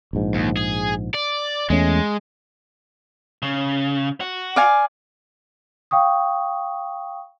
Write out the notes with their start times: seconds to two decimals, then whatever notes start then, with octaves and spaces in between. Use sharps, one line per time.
0.13 A#1 G#2
0.34 D#2
0.57 G#4
1.14 D5
1.70 E2 G#3 A3 C#4
3.42 C#3
4.21 F#4
4.56 D5 F5 G#5
5.91 F5 G5 C#6 D#6